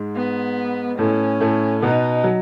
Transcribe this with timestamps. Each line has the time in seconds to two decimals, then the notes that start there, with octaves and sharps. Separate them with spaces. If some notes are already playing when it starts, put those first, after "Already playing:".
Already playing: G#2 G#3
0.16 B3
0.99 A2 A3 C#4
1.40 A2 A3
1.82 B2 B3 D#4
2.24 F#3